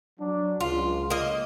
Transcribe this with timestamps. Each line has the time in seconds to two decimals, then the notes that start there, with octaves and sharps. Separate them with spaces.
0.20 F#3 D4
0.60 C#2 F4
1.10 A#3 D#5